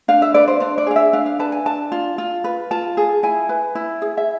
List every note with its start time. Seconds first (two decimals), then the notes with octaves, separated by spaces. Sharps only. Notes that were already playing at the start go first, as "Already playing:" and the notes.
0.08 D4 F5
0.22 E5
0.34 B4 D5
0.48 C5
0.60 D4 C5
0.78 D5
0.87 G#4 F5
0.96 E5
1.13 D4 F5
1.26 F5
1.39 B4 A5
1.52 G#5
1.66 D4 A5
1.92 F4
2.18 F4
2.44 B4
2.71 F4 A5
2.97 G#4
3.23 E4 G#5
3.49 B4
3.75 E4
4.02 G#4
4.17 E5